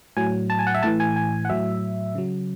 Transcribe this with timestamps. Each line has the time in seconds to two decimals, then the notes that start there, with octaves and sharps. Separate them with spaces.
0.17 A2 F#3 G#5
0.50 A5
0.59 G#5
0.67 F#5
0.74 E5
0.83 A2 E3 A5
1.00 G#5
1.16 G#5
1.45 F#5
1.50 A2 F#3 E5
2.15 C#3 F#3